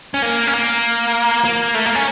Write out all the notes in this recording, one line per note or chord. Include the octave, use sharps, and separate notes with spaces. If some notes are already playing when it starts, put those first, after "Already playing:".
C#4
A#3
C#4
A#3
A#3
A3
A#3
C#4